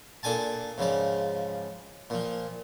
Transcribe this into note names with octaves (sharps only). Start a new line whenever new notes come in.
A#2 D4 A4 G#5 A5
G#2 C#3 F3 D5
A#2 F3